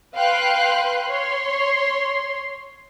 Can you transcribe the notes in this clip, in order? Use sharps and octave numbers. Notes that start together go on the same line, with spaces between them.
B4 F5 G5 C6 F#6
C#5 C6